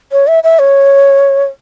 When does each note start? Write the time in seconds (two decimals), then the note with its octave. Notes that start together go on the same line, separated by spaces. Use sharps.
0.12 C#5
0.27 E5
0.44 E5
0.59 C#5